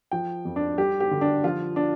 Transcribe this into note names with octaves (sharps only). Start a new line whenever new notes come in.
F3 G5
F2
D4
G3 G4
G4
D3
D4
F3 F4
D4